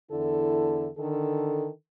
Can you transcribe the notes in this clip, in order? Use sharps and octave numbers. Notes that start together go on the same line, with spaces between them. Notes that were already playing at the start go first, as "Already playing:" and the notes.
E2 D3 E4 A4
D3 D#3 A4